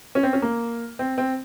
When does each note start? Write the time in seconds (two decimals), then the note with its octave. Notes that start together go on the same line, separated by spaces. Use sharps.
0.15 C#4
0.23 C4
0.33 C#4
0.42 A#3
0.99 C4
1.18 C4